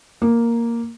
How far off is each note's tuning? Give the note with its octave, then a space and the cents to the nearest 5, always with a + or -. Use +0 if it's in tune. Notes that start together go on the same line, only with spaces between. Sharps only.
A#3 +0